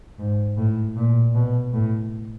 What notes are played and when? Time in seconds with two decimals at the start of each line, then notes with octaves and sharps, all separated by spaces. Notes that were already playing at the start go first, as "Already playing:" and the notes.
0.19 G#2
0.58 A2
0.96 A#2
1.35 B2
1.73 A2